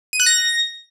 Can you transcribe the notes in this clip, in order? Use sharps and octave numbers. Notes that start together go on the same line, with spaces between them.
D#7
F#6
A#6